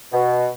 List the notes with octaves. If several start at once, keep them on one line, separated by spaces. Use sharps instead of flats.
B2